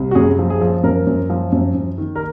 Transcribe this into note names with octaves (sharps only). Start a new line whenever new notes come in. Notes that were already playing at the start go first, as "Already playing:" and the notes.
Already playing: C2
F#4
F#2 G#4
F3
G#4
F3
F#2 A#4
F#2
F3
F#2
F#2
D#3
A#4